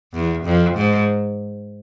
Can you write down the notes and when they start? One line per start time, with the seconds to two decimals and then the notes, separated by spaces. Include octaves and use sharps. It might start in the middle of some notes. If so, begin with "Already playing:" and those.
0.14 E2
0.45 F2
0.76 G#2